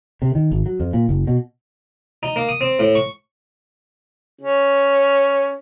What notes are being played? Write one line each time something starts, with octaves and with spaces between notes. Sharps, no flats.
C3
D#3
G#1
F#3
F2
A#2
F#1
B2
D#4
A#3
D#6
C4
A2
C#6
C#4